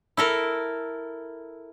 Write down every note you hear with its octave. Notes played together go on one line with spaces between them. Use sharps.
E4 A4 A#4